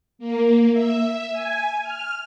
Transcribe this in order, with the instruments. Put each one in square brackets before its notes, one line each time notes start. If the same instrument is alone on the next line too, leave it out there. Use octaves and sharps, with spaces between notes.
[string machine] A#3
E5
G#5
F6